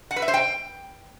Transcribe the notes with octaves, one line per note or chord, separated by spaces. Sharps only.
F#5
B4
E5
C5
G5